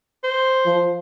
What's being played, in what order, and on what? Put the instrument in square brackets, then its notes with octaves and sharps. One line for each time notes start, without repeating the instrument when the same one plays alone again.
[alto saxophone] C5
[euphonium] F3